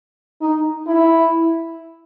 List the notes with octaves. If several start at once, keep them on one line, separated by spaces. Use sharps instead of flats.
D#4
E4